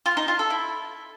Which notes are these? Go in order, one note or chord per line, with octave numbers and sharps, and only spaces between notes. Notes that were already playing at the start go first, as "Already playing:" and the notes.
F4
D#4
F4
A4
E4